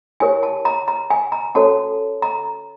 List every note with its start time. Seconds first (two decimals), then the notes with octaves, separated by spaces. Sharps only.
0.20 E4 G4 A#4 C#5 G#5
0.43 A5
0.65 A#5
0.88 A#5
1.10 G#5
1.32 A#5
1.55 C#4 F#4 A4 C#5 A5
2.22 A#5